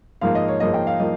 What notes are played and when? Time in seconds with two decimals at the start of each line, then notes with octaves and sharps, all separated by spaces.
0.21 G#2 F3 A#3 F5
0.35 D#5
0.48 C#5
0.60 G#2 F3 A#3 D#5
0.74 G5
0.87 F5
1.00 F3 A#3 D#5